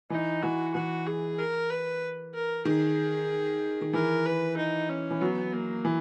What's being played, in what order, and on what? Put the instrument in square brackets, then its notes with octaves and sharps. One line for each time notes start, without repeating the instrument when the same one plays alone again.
[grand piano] E3 [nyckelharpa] D#4
[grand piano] E3 [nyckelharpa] F#4
[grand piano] E3 [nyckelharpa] F#4
[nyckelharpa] G#4
A#4
B4
A#4
[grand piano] D#3 [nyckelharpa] G#4
[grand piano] D#3
[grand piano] E3 [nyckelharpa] A#4
[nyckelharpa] B4
D#4
C#4
[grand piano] E3
[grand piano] F#3 [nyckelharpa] B3
[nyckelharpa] A#3
[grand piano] E3